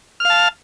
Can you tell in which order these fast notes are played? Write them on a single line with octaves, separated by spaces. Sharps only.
F6 F5 A5